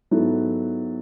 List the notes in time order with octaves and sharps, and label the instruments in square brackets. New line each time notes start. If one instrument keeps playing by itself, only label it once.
[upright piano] G#2 F#3 B3 E4 A4